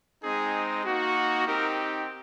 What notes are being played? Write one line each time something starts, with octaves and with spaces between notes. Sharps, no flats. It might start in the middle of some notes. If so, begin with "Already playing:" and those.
G#3 C4 D#4 G#4
A#3 D#4 F#4
C4 D#4 G4 A#4